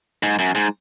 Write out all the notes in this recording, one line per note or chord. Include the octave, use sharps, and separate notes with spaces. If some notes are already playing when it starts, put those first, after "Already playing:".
G#2
F#2
G#2